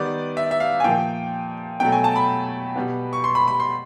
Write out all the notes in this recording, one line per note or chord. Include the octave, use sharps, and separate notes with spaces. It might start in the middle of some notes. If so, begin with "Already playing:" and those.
Already playing: D#3 G3 B3 D5
E5
E5
F5
G#5
A#2 F3 A#3 G5
B2 F#3 A3 G5
G#5
A5
B5
B2 G3 B3
C#6
C6
B5
B5
C6